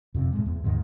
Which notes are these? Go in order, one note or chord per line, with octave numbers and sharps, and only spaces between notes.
F2 C3
A2 G#3
E2
D#2 G#2 D#3